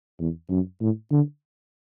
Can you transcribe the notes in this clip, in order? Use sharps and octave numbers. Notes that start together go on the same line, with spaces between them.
E2
F#2
A2
D3